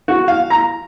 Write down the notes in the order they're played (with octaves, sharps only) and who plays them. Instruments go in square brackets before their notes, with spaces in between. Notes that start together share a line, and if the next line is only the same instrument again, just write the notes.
[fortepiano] F#4
F5
A#5